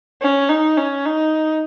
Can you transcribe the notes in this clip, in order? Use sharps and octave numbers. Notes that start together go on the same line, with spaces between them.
C#4
D#4
C#4
D#4